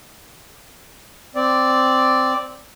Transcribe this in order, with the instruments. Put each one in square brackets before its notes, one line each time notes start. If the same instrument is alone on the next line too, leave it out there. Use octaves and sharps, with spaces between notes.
[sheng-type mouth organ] C4 D5